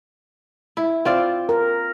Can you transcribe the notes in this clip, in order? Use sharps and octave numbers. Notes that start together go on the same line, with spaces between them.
E4
C4 F4 D5
A#4